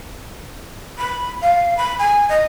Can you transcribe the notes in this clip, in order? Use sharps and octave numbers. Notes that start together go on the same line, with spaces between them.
B5
F5
B5
G#5
D#5